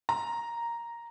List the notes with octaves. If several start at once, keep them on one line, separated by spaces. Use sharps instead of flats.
A#5